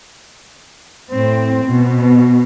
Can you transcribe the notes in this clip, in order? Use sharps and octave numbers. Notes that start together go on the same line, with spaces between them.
A2 C4
B2